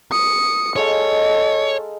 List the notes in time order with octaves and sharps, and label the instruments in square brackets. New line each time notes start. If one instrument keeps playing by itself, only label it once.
[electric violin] D#6 C#7
[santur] G#3 D#4 F5 [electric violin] A4 [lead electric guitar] C#5